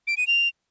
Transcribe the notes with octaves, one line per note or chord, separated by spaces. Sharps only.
D7
D#7
F7